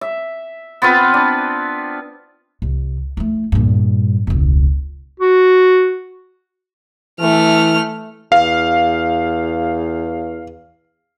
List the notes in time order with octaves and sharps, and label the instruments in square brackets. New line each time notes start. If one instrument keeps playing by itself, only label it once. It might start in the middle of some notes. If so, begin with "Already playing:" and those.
[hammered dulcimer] E5
B3 C4 F4 B4
D4
[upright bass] C2
A3 E4
G2 A#2
E1 C#2
[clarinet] F#4
[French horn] E3 [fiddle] A3 F6
[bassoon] E2 [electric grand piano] F5